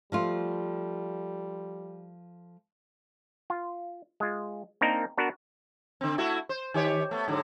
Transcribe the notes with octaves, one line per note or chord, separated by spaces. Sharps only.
F3 G3 A3 F4
F4
G#3 F4
A#3 C4 D4 D#4 A#4
B3 D4 F#4 A#4 B4
D3 C4
A3 E4 F#4
C5
D#3 G4 C#5
A3 B3
G#2 D3 F#3